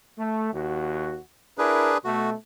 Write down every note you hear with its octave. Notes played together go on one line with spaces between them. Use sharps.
A3
D#2 F#4
D4 E4 G#4 A#4 B4
B2 A3 F#4